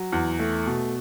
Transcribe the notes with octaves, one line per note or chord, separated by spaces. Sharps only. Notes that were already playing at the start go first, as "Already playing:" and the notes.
Already playing: F#3
E2
A3
B2